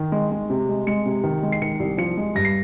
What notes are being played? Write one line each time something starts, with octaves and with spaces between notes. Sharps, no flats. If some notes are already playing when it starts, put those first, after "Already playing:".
Already playing: D#3
G#3
G#3
C3
G#3
G#3 C#7
C3
D#3
G#3
C7
D#3 C#7
C2
F3 C#7
G#3
G2 A#6
C7